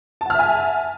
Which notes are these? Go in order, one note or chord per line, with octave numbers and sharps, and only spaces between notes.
E5 F#5 G#5 A5 F6